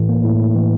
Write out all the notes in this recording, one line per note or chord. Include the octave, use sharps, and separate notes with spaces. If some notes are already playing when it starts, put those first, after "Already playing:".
Already playing: A2 E3
A#3
A2
A2
E3